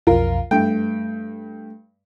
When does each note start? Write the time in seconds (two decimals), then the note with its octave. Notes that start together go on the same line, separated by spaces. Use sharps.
0.07 B1 F2 F4 A#4
0.51 G2 A3 G5